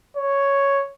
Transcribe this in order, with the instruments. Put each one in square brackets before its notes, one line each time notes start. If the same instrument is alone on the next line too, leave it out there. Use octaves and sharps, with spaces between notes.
[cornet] C#5